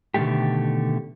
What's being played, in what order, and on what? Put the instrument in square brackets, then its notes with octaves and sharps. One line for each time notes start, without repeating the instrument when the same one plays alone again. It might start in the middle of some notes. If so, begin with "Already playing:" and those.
[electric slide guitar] B2 D3 D#3 G#3 A3 G4